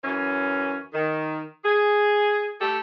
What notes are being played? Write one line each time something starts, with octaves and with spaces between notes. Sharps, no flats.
F#2 E3 C#4
D#3
G#4
A3 G4 A4